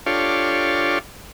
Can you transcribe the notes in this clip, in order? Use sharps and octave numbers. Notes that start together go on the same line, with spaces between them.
D4 F4 G4 A4 C#5 F5